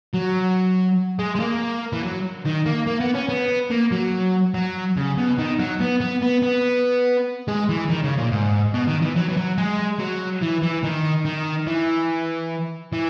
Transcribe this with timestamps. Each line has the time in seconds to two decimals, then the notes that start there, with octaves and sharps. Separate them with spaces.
0.14 F#3
1.19 G#3
1.35 G#3
1.40 A#3
1.93 E3
2.03 F#3
2.45 D#3
2.66 A#3
2.87 A#3
3.01 B3
3.15 C#4
3.29 B3
3.71 A#3
3.92 F#3
4.54 F#3
4.96 C#3
5.17 B2
5.38 D#3
5.60 F#3
5.80 B3
6.01 B3
6.22 B3
6.43 B3
7.48 G#3
7.69 E3
7.90 D#3
8.04 C#3
8.18 A#2
8.32 G#2
8.74 B2
8.87 D#3
9.02 E3
9.16 F#3
9.29 E3
9.37 F#3
9.58 G#3
10.00 F#3
10.42 E3
10.62 E3
10.84 D#3
11.26 D#3
11.67 E3
12.93 E3